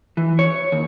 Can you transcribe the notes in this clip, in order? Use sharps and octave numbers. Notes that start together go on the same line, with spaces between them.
E3
C#5
D#2